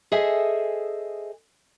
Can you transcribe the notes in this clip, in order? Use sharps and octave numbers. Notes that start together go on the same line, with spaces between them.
G#4 A4 C5 D#5 E5 G#5